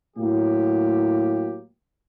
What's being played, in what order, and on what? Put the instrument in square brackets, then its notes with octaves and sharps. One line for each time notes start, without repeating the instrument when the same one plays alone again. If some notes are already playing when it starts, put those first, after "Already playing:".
[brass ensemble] A2 F#3 A#3 G4